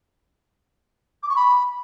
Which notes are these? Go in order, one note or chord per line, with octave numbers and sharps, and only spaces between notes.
D6
C#6
B5